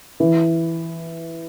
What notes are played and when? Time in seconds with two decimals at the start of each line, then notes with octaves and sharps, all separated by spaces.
0.20 E3